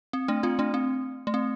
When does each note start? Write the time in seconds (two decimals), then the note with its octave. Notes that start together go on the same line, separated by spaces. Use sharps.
0.13 C4
0.28 A3 D4
0.43 C4 F4
0.59 A3 D4
0.74 C4
1.27 A3
1.34 C4